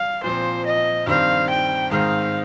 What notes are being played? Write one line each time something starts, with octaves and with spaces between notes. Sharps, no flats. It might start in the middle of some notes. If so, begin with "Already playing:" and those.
Already playing: G3 F5
A#2 F3 C4 C5
D#5
G2 D#3 G3 C4 F5
G5
G#2 D#3 G#3 C4 F5